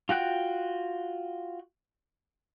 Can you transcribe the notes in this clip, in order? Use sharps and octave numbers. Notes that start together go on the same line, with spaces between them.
F4 F#4 G5 F#6